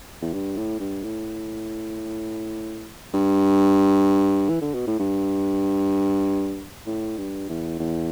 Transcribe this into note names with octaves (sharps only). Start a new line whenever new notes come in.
E2
G2
A2
G2
A2
G2
E3
D3
B2
A2
G2
A2
G2
E2
E2